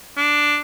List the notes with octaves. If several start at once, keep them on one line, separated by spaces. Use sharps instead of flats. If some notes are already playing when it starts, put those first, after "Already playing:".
D4